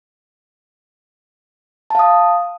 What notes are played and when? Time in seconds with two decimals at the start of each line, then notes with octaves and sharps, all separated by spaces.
1.90 A5
1.95 F5
1.99 D#6